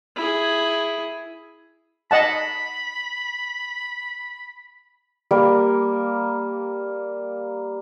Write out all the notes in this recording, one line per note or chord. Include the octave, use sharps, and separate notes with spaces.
E4 G#4
D#5 F#5 A5 B5
G3 A#3 A#4